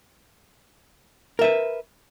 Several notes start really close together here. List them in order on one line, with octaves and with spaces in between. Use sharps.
A#4 E5 B4